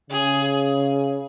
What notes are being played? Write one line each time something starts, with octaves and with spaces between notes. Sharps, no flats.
C#3 G#4